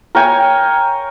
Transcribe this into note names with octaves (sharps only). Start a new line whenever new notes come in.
A#4 C#5 G5 G#5